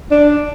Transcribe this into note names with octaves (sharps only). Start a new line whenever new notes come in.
D4